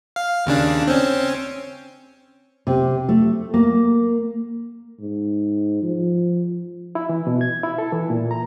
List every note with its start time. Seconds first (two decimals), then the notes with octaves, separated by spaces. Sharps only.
0.16 F5
0.46 D#2 C#3 D4
0.87 C4 C#4
2.67 C3
3.09 A3
3.54 A#3
4.99 G#2
5.83 F3
6.95 E4
7.09 E3
7.27 B2
7.41 G#6
7.63 E4
7.78 A4
7.92 E3
8.10 A#2
8.31 A#5